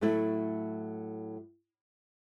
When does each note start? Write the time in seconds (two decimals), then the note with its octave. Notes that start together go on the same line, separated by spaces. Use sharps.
0.01 A2 F#3 A3 E4